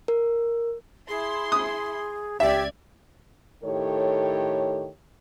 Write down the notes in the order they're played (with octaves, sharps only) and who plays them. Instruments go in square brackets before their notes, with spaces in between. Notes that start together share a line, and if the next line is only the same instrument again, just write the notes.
[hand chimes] A#4
[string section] E4 C6 [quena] G#4
[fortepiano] D#6
[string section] C#2 D5 G#6 [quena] G4 [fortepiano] E5
[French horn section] A2 D#3 G4 A4 C#5